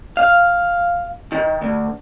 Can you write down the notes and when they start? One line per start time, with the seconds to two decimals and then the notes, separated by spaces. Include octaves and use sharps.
0.17 F5
1.32 D#3
1.62 D2